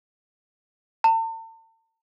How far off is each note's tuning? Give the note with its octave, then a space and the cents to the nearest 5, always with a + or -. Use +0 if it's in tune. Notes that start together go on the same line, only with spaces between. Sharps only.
A5 +45